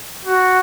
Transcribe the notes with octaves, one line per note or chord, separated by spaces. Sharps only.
F#4